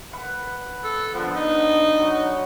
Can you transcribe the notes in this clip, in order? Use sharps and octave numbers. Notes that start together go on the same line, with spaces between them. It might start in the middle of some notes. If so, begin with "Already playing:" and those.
B4 F#5
A4
D3 F3 B3
D#4
F#3